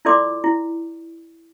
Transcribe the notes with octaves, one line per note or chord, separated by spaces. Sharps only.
E4 F4 A4 D5 C6 D6
E4